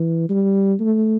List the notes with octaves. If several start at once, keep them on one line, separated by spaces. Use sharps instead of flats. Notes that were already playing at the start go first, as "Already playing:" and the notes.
Already playing: E3
G3
A3